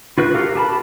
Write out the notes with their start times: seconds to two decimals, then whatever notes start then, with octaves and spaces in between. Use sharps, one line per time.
0.18 F4 F#4 B4 F#6
0.35 F#4 G4 A4 A#4 F5
0.55 G4 A5 B5